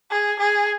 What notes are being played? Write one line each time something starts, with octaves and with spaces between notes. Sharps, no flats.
G#4
G#4